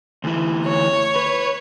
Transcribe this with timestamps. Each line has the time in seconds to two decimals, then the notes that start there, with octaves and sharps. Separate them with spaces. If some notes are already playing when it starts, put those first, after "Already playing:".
0.24 D2 E3
0.67 C#5
1.16 B4